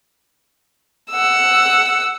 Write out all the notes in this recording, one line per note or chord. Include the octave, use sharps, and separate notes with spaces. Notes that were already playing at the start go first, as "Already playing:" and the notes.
F#5 E6